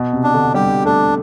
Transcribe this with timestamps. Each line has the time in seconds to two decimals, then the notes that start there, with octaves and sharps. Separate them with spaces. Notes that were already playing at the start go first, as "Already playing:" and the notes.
Already playing: B2
0.13 C3
0.24 D4
0.34 D3
0.54 G3 G4
0.85 A3 D4